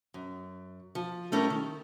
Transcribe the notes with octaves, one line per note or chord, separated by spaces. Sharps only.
F#2
F3
G3 A3 C#4 E4 A#4
D#3